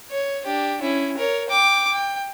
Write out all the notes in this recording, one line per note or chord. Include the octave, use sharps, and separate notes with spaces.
C#5
D4 G4
C#4 E4
A#4 C#5
G5 D6
G5